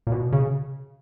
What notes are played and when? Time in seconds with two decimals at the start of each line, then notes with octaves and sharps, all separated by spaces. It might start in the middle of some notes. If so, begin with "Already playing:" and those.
0.07 A#2
0.12 B2
0.32 C#3